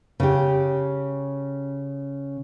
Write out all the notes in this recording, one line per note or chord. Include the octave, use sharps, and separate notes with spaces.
C#3 G4